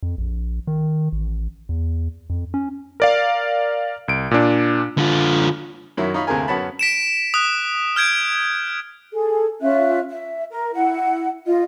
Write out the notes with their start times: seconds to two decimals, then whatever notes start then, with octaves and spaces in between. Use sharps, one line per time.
0.03 F2
0.18 A#1
0.67 D#3
1.12 A1
1.69 E2
2.30 F2
2.54 C#4
3.00 A#4 D5 F5
4.08 C2 D7
4.31 A#2 D4
4.98 D3 F4
5.97 F#2 D#3 F#3 E4
6.14 D#4 F4 C#5 B5
6.27 D2 C3 A#3 G#4 A#4 G#5
6.48 F#2 B3 C#4 F#4 A5 B5
6.79 B6 D7 E7
7.34 D#6 F#6
7.96 F6 G6 G#6 D7
9.11 G#4 A4
9.60 C#4 F4 E5 F#6
10.08 E5
10.51 A#4
10.73 E4 F#5
11.47 F4 D#5